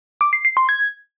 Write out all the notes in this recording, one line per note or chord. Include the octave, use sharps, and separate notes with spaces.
D6
C7
C7
C6
G#6